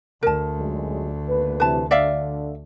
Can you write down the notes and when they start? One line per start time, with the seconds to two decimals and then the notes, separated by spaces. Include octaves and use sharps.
0.23 D2 A#4 A5
0.58 F#2 A#2 G#3
1.27 G#1 A#3 B4
1.60 C3 E3 B4 A5
1.91 D3 D5 E5 F5